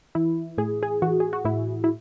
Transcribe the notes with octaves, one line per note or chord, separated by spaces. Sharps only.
E3 E4
A2 G#4
G#4
E3 F#4
G#4
F#4
A2 E4
E4